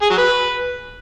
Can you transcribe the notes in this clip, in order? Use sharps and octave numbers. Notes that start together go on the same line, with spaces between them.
G#4
F#3
B4